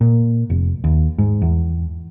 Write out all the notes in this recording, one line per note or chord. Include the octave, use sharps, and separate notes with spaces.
A#2
F1
D#2
G#2
E2